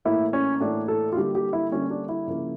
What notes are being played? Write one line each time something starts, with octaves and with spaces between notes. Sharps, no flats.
A2 E3 A#3 E4
C#4
A2 E3 A#3 D4
A4
F4
D3 G3 A#3 G4
G4
E4
D3 G3 A#3 C#4
D4
E4
C#3 F3 A#3